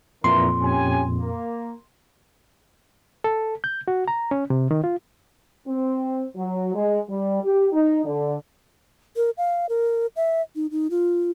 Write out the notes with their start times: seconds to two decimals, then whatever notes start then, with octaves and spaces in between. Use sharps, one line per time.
0.24 F2 A#2 E3 D4 A#4 C6
0.63 C#4 G4 G#5
1.17 A#3
3.24 A4
3.64 G6
3.88 F#4
4.08 A#5
4.31 C#4
4.50 C3
4.71 D#3
4.84 F4
5.67 C4
6.36 F#3
6.75 G#3
7.08 G3
7.42 G4
7.72 D#4
8.04 D3
9.16 A#4
9.38 F5
9.69 A#4
10.16 E5
10.56 D#4
10.71 D#4
10.91 F4